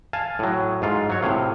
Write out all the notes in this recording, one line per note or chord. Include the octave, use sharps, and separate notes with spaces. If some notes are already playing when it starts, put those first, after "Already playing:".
F5 G#5 A5
A2 F#3
G#2 F4
F#3 C#5
A2 C3 F5